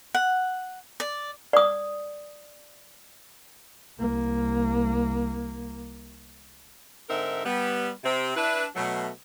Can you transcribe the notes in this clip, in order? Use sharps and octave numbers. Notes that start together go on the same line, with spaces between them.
F#5
D5
D5 D#6
C2 A#3
G#2 D3 C4 D#4 A#4 E5
G3 B3
C3 C4
D4 E4 B4
B2 F#3 A3